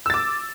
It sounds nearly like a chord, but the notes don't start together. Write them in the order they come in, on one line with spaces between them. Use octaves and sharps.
E6 A6 D6